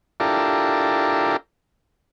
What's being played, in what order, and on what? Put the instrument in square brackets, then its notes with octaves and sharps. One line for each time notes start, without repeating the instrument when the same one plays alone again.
[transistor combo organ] D4 E4 F4 G4 A4 A#4